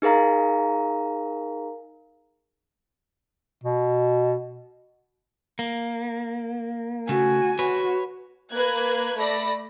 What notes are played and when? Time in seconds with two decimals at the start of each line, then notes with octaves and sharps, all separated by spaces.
0.02 D#4 G#4 A#4 F5 A#5
3.64 B2
5.59 A#3
7.09 C#3 A3 F#4 G#5
7.59 F#4 B4 C#5
8.52 A#3 B4 F#6 G#6
9.17 A3 D5 B5 A#6